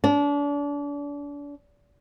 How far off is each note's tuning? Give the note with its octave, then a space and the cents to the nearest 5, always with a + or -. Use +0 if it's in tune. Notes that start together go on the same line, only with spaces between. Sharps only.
D4 -35